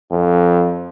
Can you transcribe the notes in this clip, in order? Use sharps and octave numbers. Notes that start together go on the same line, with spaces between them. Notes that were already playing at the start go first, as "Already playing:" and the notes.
F2